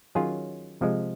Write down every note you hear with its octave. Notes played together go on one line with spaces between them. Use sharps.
D#3 F#3 C#4 F4 G#4
C3 F3 G#3